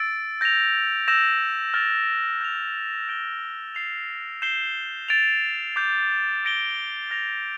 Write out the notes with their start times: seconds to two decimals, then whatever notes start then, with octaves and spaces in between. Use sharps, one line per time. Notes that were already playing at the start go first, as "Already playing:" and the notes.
Already playing: E6 A6 D7
0.41 G6 A#6 F7
1.08 E6 G6 A#6 E7
1.74 F6 A6 D7 F7
2.41 G6 D7 F7
3.09 G6 D7 G7
3.75 A6 C7 F7
4.42 G6 C7 E7 G7
5.08 A6 D7 F7
5.76 D6 G6 C7
6.43 E6 A#6 D7 G7
7.10 F6 A#6 F7